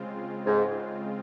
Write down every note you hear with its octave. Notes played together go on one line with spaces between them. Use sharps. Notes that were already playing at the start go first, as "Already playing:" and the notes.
Already playing: C#3 G#3 C4 F4
G#2